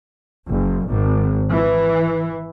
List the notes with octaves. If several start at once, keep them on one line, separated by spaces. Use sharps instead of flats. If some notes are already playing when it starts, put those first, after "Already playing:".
F#1
G#1
E3